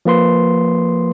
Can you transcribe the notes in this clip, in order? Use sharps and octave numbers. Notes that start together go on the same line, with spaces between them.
F3 A#3 B4 C6